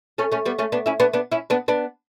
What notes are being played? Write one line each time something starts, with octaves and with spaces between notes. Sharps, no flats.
A3 C#4
A3 C#4
G3 B3
A3 C#4
B3 D4
C#4 E4
B3 D4
B3 D4
C#4 E4
B3 D4
B3 D4